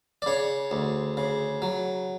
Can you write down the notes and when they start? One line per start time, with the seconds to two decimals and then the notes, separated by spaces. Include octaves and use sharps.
0.22 D5
0.26 C#3 C#5
0.71 D2
1.17 C#3
1.62 F#3